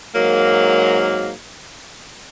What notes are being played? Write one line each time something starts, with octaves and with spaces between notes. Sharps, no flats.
G#2 F#3 A#3